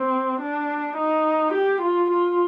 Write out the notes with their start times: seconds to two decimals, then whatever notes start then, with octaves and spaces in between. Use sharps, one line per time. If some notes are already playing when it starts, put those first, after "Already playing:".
Already playing: C4
0.40 D4
0.97 D#4
1.53 G4
1.81 F4
2.10 F4